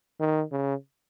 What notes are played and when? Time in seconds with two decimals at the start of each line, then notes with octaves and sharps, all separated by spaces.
0.20 D#3
0.52 C#3